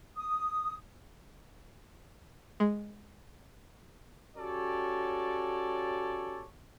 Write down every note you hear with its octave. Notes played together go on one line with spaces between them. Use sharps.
D#6
G#3
C#4 F#4 G4 A4 C#5 D5